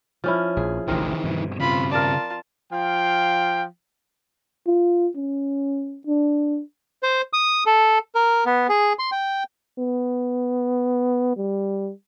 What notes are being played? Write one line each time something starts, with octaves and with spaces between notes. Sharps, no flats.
F3 C#4 E4
A#1 G#4
A1 D2 C3 D#3 E3 C4 A#4
G2 B2
C#3 C4 F4 B5
F4 A#4 D5 A5
F3 F5 G5
F4
C#4
D4
C5
D#6
A4
A#4
B3
G#4
C6
G5
B3
G3